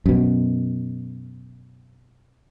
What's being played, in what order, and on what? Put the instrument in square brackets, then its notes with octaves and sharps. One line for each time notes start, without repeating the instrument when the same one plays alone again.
[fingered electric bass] F#2 B2